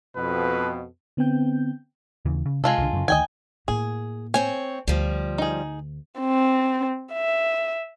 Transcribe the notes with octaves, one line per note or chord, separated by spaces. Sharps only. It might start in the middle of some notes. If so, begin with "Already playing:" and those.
F2 B2 B4
D3 B3 C4 G5 G6
D#2 C#3 E3
C#3
C3 G#3 F4 A4
C2 D3
F#2 C#3
D2 D#3 D#5 G5 G#5
A2 A#3 G#4
C4 C#5 G#5
D2 F3 G3
D#4 G#4
C4
E5